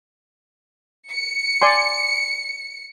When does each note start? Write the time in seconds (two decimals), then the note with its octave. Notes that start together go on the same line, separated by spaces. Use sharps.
1.09 C#7
1.62 D5 G#5 C6